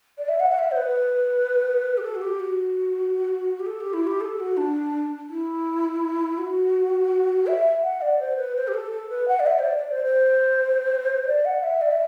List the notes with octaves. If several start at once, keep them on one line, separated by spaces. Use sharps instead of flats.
D5
E5
F#5
F#5
E5
C5
B4
G4
A4
F#4
G4
F#4
G4
A4
G4
E4
G4
A4
F#4
D4
E4
F#4
E5
F#5
D5
C5
B4
C5
G4
A4
A4
B4
F#5
D5
E5
C5
D5
D5
C5
C5
D5
F#5
E5
D5
E5